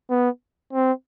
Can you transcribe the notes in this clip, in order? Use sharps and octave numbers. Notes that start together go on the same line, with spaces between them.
B3
C4